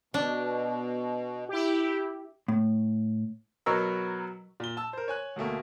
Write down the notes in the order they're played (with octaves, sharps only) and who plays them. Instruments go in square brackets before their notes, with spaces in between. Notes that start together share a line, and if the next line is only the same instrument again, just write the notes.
[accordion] B2 [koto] D4
[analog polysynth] E4 G4
[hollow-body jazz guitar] A2
[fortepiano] B2 F#3 A#4 E6
[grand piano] A#2 G7
A5 E6
A#4 C5
C#5 G#5 F#6
D2 B2 A3 A#3